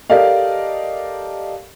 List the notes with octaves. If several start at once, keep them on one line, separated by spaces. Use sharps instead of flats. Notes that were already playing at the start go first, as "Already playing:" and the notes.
G4 A4 A#4 D5 D#5 F5